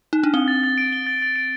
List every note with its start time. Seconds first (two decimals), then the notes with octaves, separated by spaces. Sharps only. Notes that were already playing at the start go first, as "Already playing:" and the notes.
0.13 D#4
0.24 D4
0.34 C4 G7
0.48 A6
0.64 A6
0.78 D7
0.93 G7
1.07 A6
1.22 A6
1.36 D7